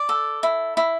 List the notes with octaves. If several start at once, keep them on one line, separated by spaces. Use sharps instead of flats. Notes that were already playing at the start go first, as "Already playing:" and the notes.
Already playing: D5
A4
E4
E4